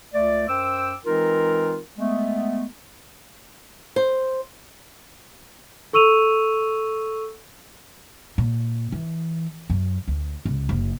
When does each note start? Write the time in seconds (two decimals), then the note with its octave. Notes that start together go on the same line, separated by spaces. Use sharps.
0.14 C#2 A3 D5
0.48 F#2 C5 G5 D6 E6
1.05 E3 G#3 C4 D#4 F4 A#4
1.98 G#3 A3 B3
3.96 C5
5.93 A4 C#6 E6 D#7 F7
8.38 A#2
8.92 E3
9.70 F#2
10.08 D2
10.45 C#2
10.69 F#1